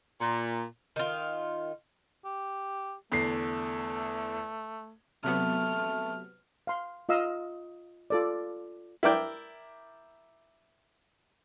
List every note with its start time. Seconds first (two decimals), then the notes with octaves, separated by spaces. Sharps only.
0.21 A#2
0.96 D#3 F4
2.25 G4
3.12 E2 D3 A3 C7
5.24 C3 F#3 A3 B3 F6
6.67 F5 C6
7.09 F4 D#5 F5 E6
8.10 F4 A4 D5
9.03 E4 A#4 D5 G5